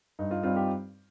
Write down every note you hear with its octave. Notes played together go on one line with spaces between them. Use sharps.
G2 D#4
F4
G3 C4 F4
G4